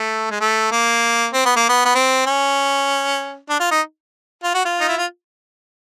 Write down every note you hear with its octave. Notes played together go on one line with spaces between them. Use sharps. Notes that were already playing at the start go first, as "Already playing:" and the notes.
Already playing: A3
G#3
A3
A#3
C4
B3
A#3
B3
B3
C4
C#4
D4
F4
D#4
F4
F#4
F4
D#4
E4
F4